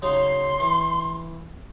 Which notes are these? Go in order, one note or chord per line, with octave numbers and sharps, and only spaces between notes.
C#3 F#3 D#4 C6
E3